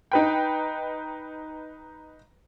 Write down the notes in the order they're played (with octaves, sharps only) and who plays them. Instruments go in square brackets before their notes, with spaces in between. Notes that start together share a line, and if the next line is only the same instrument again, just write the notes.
[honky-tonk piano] D#4 B4 G5